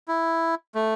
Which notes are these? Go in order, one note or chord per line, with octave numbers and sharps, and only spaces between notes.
E4
A3